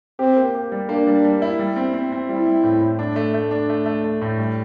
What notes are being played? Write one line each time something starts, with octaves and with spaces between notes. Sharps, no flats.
C4 G4
A#3
G4
G3
A#3 D4
G3
G3
E4
G3
C4
C4
C4
G3 E4
G3
A2
A2
D4
A3
A3
D4
A3
A3
A3
A2
G3